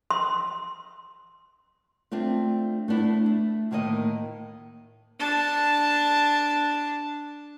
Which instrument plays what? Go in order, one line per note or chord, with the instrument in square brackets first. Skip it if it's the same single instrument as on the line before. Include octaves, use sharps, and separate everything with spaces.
[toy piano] C6
[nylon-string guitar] A3 C4 D4 F4
A3 B3 D4 E4
A3
D2 A2 D#3 A#3 D#5
[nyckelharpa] D4 A5